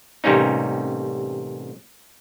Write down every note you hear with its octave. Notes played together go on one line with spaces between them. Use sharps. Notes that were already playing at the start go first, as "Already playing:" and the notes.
A1 C3 G3 A#3 C#4 D#4